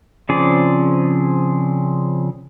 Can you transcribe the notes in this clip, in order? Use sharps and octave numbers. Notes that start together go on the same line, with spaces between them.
C#3 F3 C4 G#4 D5